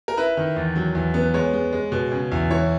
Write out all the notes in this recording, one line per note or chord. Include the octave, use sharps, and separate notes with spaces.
A#4
E4 B4
D#3
E2
F#3
E2
B3
G#3 C#5
G#3
G#3
B2
C#3
E2
E3 C#5